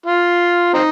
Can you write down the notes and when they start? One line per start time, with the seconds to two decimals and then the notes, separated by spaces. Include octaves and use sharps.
0.06 F4
0.74 C4 D#4